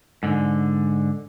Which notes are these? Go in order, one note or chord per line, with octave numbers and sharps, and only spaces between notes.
G#2 D3